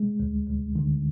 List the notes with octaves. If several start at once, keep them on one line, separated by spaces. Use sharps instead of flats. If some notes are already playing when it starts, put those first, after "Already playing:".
Already playing: G#3
D2
D2
D3